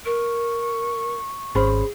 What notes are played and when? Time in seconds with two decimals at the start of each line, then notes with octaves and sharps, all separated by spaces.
0.05 A#4 C#6
1.55 G#1 C#4 G#4 C5 B5